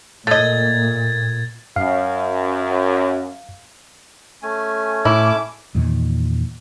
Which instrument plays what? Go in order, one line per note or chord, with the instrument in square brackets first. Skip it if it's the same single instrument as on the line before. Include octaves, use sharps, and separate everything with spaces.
[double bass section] A#2 [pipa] A3 D#5 [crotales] G#6 A6
[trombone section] F#2 [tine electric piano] F5
[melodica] A3 C#4 G#5
[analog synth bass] A2 [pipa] E4 [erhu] D6
[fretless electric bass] E2 A#2 D#3